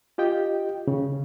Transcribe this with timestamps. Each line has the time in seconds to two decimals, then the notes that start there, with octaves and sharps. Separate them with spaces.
0.18 F4 G4 D#5 G5
0.88 C#3